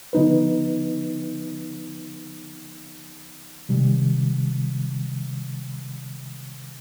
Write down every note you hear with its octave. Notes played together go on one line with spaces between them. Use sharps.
D3 F3 B3 D#4 B4
C3 D#3 G3